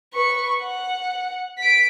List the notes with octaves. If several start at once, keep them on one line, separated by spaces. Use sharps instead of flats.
B4 C#6
F#5
B6 D7